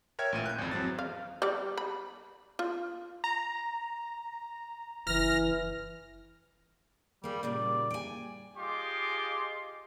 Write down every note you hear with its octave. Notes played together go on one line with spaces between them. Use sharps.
A#4 C#5 E5 G5 F6 G#6
A1 A#2 D#7
F#6 G6
G#1 F2
E2 F#3 C4 A6
F5
G3 D5
B5
F4
A#5
F#1 E3 F6 A#6
G3 A#3 G#4
A#2 C#3 G3 D5
G5 G#5
F4 G4 G#4 D#5 C6 D6